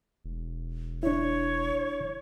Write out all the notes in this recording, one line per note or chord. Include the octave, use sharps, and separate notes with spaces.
E1
D4 E4 C#5